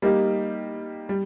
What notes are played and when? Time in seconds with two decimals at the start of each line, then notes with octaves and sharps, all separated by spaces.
0.02 G3 A#3 D#4 G4
1.09 G3